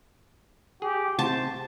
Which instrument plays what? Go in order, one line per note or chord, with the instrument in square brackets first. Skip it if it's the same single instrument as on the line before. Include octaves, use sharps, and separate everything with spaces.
[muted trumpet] G4 [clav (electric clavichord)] G#4
[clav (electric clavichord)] C3 [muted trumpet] C5 [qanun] A5